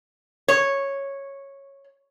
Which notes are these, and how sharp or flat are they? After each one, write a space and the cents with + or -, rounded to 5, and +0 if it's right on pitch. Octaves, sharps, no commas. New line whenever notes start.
C#5 -10